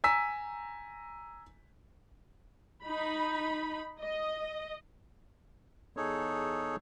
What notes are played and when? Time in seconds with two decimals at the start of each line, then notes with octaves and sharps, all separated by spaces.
0.04 G#5 A#5 E6 B6
2.84 D#4 B5
4.01 D#5
5.97 E2 D#4 G#4 A4 C#5